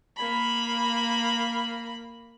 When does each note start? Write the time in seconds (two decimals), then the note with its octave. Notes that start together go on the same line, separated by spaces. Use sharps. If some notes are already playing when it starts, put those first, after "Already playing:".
0.17 A#3 B5